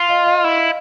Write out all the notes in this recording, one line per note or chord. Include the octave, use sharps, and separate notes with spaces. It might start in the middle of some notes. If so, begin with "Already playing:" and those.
Already playing: F4
D#5 F5
D#5 F5
E4